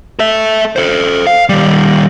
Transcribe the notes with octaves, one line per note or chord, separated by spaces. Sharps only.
A4 E5
A4 C5
F5
D#3 G3